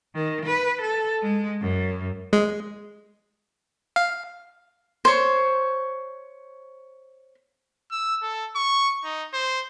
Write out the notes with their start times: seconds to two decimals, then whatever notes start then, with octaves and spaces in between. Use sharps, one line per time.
0.15 D#3
0.45 B4
0.81 A4
1.22 G#3
1.61 F#2
2.33 G#3
3.96 F5
5.05 C5 C#5
7.91 E6
8.22 A4
8.56 C#6
9.04 D#4
9.34 C5